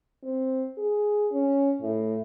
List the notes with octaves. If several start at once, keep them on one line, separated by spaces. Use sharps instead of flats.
C4
G#4
C#4
A2